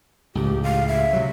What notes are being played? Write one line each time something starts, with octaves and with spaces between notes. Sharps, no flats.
C#2 A2 G4
F5
E5
C3 F#3